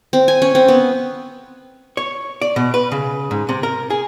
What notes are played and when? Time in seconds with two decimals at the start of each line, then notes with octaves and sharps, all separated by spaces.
0.13 C4
0.28 G#5
0.42 C#4
0.55 C4
0.68 B3
1.97 C#5
2.42 D5
2.56 B2
2.74 B4
2.92 C#3
3.31 G#2
3.49 C3
3.63 A#4
3.90 G#4